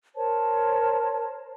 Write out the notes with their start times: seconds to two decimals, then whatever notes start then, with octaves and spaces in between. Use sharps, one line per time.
0.15 A#4 C5 C#5 A5